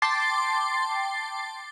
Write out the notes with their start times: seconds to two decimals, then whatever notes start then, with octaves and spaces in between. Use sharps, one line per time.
0.02 G5 A5 C6 D6 A6 C7